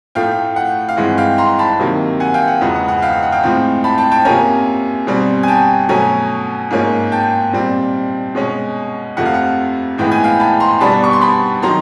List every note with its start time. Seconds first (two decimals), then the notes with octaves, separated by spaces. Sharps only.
0.15 A2 F3 A3 F5 G5
0.56 F#5
0.89 F5
0.97 G2 E3 G#3 C4 F#5
1.18 F5 G5
1.38 A#5 C6
1.59 A5 B5
1.79 C3 D#3 F#3 A#3
2.20 F#5 G#5
2.34 F5 G5
2.47 F#5
2.61 E2 C#3 F3 G#3 B3 F#5
2.75 F#5
2.88 F#5
3.02 F5 G5
3.12 F5
3.23 F#5
3.32 F5 G5
3.43 A2 F3 G#3 C4
3.84 A5 B5
3.98 G5 A5
4.11 G5 A5
4.25 C3 F3 A#3 C#4 G#5 A#5
5.07 B2 G3 C4
5.43 G#5
5.48 G5 A5
5.89 B2 F#3 A3 C#4 G#5 A#5
6.71 G#2 F3 A#3 C#4
7.12 G5 A5
7.53 A#2 G3 C4
8.35 B2 G#3 C#4
9.17 F2 C3 F3 A3 F#5
9.26 F5
9.34 F#5
9.98 A2 E3 G#3 B3 G5
10.12 G#5
10.24 F5 G5
10.40 A5 B5
10.60 A#5 C6
10.80 B2 G3 B3 D4 A5 B5
11.04 C#6
11.13 C6
11.22 A5 B5
11.62 D#3 F#3 A#5 C6